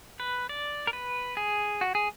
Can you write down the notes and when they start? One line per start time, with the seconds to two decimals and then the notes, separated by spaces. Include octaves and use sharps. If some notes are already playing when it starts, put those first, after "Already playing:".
0.20 B4
0.49 D5
0.87 A#4
0.93 B4
1.37 G#4
1.81 F#4
1.95 G#4